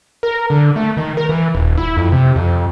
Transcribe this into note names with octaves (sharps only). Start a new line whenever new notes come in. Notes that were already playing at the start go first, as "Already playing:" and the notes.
A#4
D3
A3
D#3
A#4
E3
D#1
E4
F2
C3
F2